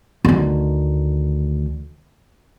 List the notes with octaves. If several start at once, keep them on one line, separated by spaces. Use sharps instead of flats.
D2 D#3